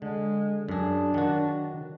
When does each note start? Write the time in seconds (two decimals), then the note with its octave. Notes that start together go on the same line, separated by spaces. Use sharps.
0.02 D3 G#3
0.69 F#2 D4 G#4
1.14 D#3 F#3 F#4